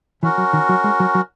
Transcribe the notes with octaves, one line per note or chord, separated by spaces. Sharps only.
E3 C#4 F#4 A#4
F#3
D#3
F#3
G#3
F#3
F#3